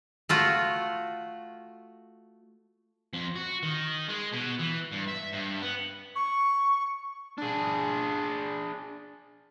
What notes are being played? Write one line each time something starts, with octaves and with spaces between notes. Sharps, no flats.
A3 F4 F#4
F2
F#4
D#3
G#3
B2
E3
G2
E5
G2
B3
C#6
D4 G#4